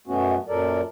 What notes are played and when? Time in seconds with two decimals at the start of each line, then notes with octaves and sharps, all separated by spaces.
0.07 F#2 B2 A3 B3 C#4 F#4
0.48 F#2 A#2 F#3 A4 A#4 D5